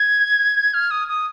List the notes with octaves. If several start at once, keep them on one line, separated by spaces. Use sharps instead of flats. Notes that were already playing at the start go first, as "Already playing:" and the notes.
Already playing: G#6
F6
D#6
D#6